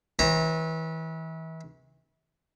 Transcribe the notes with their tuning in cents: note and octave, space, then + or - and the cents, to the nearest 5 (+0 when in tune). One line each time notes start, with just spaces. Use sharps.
E3 -30 C#5 -40 A#5 +0